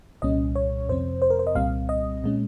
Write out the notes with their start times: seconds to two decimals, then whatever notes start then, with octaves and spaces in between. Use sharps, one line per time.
0.22 C2 A#2 G3 C#4 D#5
0.55 C#5
0.89 F2 C3 F3 C4 C5
1.22 C5
1.30 A#4
1.39 C5
1.47 D#5
1.55 C2 A#2 G3 C4 F5
1.89 D#5
2.24 A#2 G#3 C#4